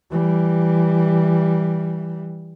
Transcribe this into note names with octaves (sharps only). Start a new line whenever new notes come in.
E3 G3